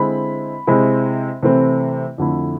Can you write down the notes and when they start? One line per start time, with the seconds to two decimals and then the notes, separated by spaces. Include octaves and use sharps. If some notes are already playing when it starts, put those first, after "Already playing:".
Already playing: D3 G#3 C4 E4 B5
0.67 C3 G#3 C4 E4
1.43 C3 E3 A3 C4 E4
2.18 F2 D3 A3 E4